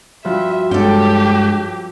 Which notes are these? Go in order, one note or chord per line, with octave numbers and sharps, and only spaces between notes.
G2 F3 F#4 E5
G2 G#3 C#4 G4 A4 G5